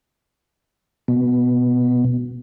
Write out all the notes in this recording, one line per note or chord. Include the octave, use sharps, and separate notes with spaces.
B2